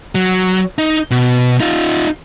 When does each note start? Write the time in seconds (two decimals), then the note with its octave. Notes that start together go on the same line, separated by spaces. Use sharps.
0.15 F#3
0.78 D#4
1.11 B2
1.61 D#4 F4